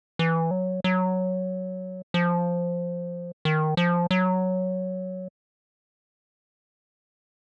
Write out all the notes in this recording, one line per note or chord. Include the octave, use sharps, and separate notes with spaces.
E3
F#3
F#3
F3
D#3
F3
F#3